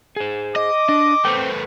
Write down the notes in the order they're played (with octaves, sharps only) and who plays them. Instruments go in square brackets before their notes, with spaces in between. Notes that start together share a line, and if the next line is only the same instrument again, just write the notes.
[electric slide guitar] G#4 C5
[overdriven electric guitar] D#5 [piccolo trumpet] D6
[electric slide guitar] D4 [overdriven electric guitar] D#5
[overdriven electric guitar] A3 B3 [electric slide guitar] C5 G5